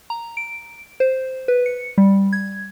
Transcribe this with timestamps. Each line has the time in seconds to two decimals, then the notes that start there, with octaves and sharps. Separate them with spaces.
0.10 A#5
0.37 D7
1.00 C5
1.48 B4
1.66 C#7
1.98 G3
2.33 G#6